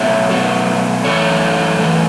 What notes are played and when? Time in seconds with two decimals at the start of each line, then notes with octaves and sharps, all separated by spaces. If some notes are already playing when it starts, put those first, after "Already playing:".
Already playing: B2 F#3 A3 C#5 E5
0.29 B2 F#3 A3
1.04 F#2 E3 A3 A4 C#5
1.79 F#2 E3 A3